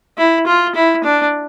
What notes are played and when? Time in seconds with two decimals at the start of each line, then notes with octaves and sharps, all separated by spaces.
0.18 E4
0.47 F4
0.75 E4
1.04 D4